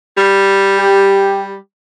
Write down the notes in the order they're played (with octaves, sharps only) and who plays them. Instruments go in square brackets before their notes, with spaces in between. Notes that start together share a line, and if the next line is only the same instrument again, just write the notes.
[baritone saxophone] G3
[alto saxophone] G4